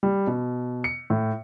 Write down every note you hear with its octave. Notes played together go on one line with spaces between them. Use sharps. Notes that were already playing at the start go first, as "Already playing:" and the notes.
G3
B2
C#7
A2